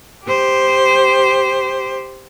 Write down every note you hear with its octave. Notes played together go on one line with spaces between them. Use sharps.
G4 C5